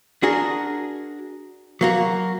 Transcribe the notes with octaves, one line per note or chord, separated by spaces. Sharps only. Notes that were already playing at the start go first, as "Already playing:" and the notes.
D4 F#4 G#4 A#4
F#3 A#3 F#4